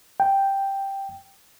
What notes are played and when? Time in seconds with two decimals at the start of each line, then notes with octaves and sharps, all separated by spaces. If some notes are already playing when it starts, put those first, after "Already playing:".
0.20 G5